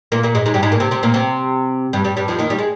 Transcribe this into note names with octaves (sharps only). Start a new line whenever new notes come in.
A#2 A#3
A#2 A#3
G#2 G#3
G#2 G#3
G2 G3
G#2 G#3
A#2 A#3
C3 C4
C3 C4
A#2 A#3
C3 C4
G2 G3
G2 G3
G2 G3
F2 F3
D#2 D#3
G3
G#3